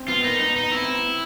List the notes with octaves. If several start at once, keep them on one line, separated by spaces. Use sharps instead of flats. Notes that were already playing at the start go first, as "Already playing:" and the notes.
Already playing: C4
B3 F4
A#3 D#4
B3 D#4
D#4
C4 E4
C4
B3
C4